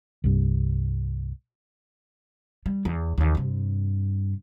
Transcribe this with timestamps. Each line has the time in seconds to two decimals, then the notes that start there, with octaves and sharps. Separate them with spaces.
0.24 C2 G2
2.66 G3
2.85 E2
3.18 D#2 E3
3.35 G2 C3